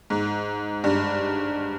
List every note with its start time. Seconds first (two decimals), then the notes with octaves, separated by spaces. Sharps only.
0.10 G#2
0.84 G2